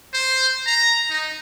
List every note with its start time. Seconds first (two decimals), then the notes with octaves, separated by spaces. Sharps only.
0.13 C5
0.66 A#5
1.10 D#4